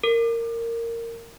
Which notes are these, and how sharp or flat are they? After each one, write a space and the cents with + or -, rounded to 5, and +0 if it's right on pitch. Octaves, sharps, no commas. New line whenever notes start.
A#4 -15